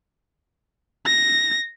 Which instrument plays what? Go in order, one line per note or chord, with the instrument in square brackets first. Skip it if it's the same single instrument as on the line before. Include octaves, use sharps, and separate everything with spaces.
[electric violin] A#6